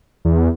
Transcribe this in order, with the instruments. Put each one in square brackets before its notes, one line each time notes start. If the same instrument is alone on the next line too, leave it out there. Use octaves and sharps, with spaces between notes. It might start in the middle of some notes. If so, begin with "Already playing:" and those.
[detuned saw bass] E2